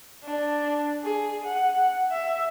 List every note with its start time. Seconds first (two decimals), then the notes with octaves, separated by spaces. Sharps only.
0.24 D4
1.03 G#4
1.46 F#5
2.12 E5